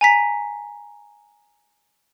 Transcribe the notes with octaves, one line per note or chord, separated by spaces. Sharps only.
G#5 A#5 B6